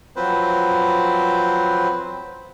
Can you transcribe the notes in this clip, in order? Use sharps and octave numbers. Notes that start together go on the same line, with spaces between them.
F3 F#3 C4 B4 C5